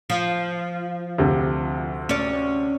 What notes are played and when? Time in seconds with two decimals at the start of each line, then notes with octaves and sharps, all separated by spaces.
0.10 F3
1.18 D2 C3
2.09 C#4 D5